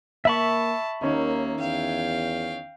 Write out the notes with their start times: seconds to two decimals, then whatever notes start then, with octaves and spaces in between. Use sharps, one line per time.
0.25 A#3 E5 A5 B5 C#6
1.02 D#2 D#3 A#3 C#4 D#4
1.60 E2 F5 G5